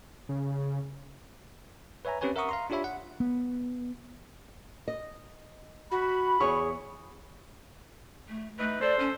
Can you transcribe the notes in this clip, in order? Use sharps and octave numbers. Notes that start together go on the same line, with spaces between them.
C#3
B4 C#5 E5 G#5 A#5
C4 C#4 G4 B4 C#5 G#5
A#4 E5 F#5 A#5 C#6 D#6
F5 A#5 C6
D4 F4 G4 C#5 E5 B5
F#5
B3
D#5
F#4 B5
E2 G#4 C#5 G#5 C#6
A3
E3 A3 D#4 B4
A4 C5 D5
C#4